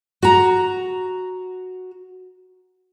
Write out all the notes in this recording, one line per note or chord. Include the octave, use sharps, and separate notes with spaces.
F#4 A#5